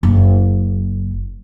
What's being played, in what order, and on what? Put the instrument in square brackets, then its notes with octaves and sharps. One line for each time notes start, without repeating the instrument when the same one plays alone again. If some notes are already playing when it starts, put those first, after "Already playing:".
[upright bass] F#1